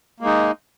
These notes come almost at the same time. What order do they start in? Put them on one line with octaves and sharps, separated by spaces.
A#3 G#3 D#4